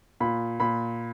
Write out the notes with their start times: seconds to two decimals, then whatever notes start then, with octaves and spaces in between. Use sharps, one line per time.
0.20 A#2 B5
0.60 A#2 B5